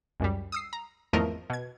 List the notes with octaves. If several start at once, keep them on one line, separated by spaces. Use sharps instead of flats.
C#2 F#2 G3
D#6 E6 C7
A#5
G#1 E2 F3 A3 A#4 D#5
B2 G#6